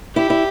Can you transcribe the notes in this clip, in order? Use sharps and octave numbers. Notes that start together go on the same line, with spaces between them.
E4 G4
E4